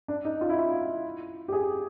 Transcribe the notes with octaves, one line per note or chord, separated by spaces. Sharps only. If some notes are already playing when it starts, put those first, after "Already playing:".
D4
D#4
F4
E4
F4
G4
G#4